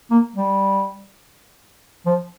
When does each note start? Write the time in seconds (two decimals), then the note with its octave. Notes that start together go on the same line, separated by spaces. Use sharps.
0.11 A#3
0.36 G3
2.06 F3